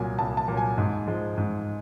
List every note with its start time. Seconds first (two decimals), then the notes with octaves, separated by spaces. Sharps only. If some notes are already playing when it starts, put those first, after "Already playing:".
Already playing: C2 A#2 F#3 G#5
0.18 C2 A5
0.37 A5
0.48 A#2 F#3
0.57 G#5
0.78 G#2
1.07 F3 G#3
1.38 G#2